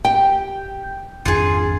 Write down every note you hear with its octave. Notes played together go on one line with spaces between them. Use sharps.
G4 G5
G#1 F2 D4 F4 G#4